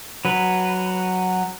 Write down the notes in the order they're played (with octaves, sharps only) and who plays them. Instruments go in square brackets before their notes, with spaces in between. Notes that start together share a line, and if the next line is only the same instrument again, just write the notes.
[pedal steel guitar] F#3 B4